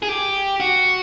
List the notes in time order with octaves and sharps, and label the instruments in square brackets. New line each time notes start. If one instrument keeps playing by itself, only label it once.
[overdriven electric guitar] G#4
G4
F#4